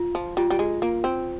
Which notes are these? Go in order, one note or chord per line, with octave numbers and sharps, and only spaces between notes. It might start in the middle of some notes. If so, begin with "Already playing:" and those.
Already playing: F4
F3
G3 F4
G3
G#3
A#3 F4
C4